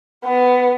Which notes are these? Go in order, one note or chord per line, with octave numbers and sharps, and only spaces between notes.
B3